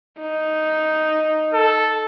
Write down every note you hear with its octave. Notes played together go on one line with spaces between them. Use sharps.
D#4
A4